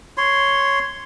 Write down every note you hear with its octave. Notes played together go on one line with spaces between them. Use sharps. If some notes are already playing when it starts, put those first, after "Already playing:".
C#5 C6